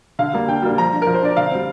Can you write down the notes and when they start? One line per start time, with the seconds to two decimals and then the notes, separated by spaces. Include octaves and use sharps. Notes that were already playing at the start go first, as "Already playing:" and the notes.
0.19 D3 F5
0.33 G3 A#3 D4
0.48 D3 G5
0.62 G3 A#3 D4
0.78 F3 A#5
0.93 D4
1.02 F3 A#4
1.14 C5
1.22 D4 D5
1.37 D3 F5
1.51 G3 C4